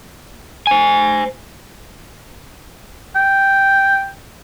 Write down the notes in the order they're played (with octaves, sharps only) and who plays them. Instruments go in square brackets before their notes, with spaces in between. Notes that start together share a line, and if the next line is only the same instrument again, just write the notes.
[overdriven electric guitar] C5 G#5
[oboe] G5